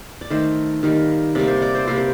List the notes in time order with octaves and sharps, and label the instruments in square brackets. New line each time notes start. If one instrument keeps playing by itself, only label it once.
[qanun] D5
D#3 A3 C5
D#3 G3 A#3
C3 G3 A#3 D5
C5
D5
C5
C3 G3 A#3 C5
C5